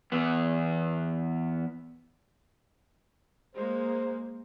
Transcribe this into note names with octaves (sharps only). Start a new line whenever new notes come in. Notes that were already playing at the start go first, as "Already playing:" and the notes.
E2 B3
G#3 A#3 C5